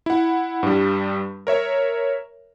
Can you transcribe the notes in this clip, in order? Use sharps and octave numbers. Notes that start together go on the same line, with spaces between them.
E4 F#5
G2 G3
A#4 C#5 E5